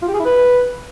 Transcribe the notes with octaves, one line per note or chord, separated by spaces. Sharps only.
F4
G4
G#4
E4
B4